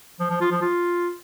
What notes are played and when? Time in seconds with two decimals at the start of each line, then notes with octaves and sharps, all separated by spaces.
0.20 F3
0.30 F3
0.41 F4
0.51 F3
0.62 F4